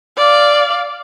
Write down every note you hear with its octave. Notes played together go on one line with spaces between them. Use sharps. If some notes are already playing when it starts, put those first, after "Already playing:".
D5 F5